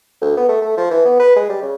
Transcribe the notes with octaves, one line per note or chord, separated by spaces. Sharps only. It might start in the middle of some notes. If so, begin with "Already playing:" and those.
D2
B3
A3
A3
F3
E3
B3
B4
G#3
G3
C#3